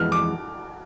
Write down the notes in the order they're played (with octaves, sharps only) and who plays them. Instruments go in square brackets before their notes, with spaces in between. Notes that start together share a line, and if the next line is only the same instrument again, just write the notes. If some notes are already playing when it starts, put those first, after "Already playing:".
Already playing: [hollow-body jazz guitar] F2 E3 G#3 B3 [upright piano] F6
[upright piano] D6